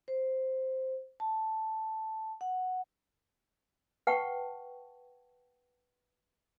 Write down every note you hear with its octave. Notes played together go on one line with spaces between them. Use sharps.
C5
A5
F#5
B4 F#5 G5 A5 C#6